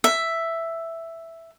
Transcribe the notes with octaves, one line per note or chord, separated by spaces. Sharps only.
E5